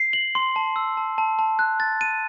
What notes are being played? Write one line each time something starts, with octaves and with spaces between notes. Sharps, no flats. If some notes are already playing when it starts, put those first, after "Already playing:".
Already playing: C7
F#7
C6
A5
E6
A5
A5
A5
F#6
A6
D#7